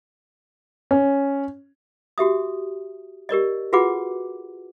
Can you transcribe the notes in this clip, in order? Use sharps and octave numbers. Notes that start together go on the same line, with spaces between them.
C#4
F#4 G4 E5 D#6
G4 A#4 D5 D#5
F4 F#4 G#4 B4 F#5 D6